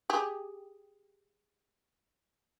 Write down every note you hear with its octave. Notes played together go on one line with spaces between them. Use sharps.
G4 G#4